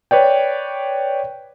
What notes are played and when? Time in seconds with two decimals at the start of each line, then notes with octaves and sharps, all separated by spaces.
0.11 B4 C#5 D5 G5